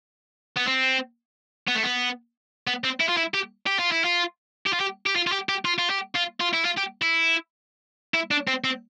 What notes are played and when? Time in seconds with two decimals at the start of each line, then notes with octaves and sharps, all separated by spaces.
0.57 B3
0.68 C4
1.67 B3
1.75 A3
1.83 B3
2.67 B3
2.84 C4
3.00 E4
3.08 F4
3.17 E4
3.34 G4
3.66 G4
3.79 F4
3.92 E4
4.05 F4
4.66 G4
4.73 F4
4.80 G4
5.06 G4
5.16 F4
5.27 F4
5.32 G4
5.49 G4
5.65 F4
5.79 F4
5.90 G4
6.15 F4
6.41 F4
6.54 E4
6.65 F4
6.78 G4
7.02 E4
8.14 E4
8.31 D4
8.47 C4
8.64 C4